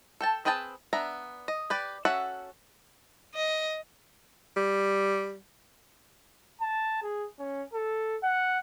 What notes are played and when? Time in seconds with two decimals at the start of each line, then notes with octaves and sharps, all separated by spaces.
0.21 A4 G5 A5
0.45 C4 G#4 B4 G5 A5
0.93 B3 D4 E5 A#5
1.48 D#5
1.70 G4 B4 D5
2.05 C#4 F#4 A4 E5 F#5
3.35 D#5
4.57 G3
6.61 A5
7.02 G#4
7.39 C#4
7.74 A4
8.23 F#5